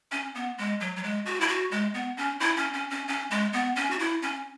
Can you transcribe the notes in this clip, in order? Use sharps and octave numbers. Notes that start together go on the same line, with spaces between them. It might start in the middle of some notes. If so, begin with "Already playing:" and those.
C#4
B3
G#3
F#3
F#3
G#3
F#4
E4
F#4
G#3
B3
C#4
E4
C#4
C#4
C#4
C#4
G#3
B3
C#4
F#4
E4
C#4